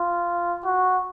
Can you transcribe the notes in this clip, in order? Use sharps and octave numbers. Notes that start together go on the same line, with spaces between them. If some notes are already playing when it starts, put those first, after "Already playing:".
Already playing: F4
F#4